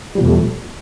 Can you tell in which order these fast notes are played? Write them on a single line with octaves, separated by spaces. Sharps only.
G3 F3 B2 E2 A3